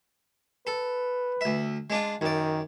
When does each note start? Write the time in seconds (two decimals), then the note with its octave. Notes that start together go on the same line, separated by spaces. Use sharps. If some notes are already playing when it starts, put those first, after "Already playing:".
0.67 A4 B4
1.41 D2 E5
1.90 G#3 D4 F4
2.21 F#2 D#3 D5